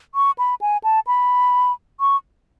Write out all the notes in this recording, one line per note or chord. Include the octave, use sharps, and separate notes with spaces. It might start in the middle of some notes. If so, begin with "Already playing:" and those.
C#6
B5
G#5
A5
B5
C#6